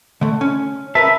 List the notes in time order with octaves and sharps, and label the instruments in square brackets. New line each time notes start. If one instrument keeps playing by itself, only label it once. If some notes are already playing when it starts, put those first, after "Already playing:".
[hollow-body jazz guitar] D3 A3
C#4
[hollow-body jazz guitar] A#4 B4 A5 [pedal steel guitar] E5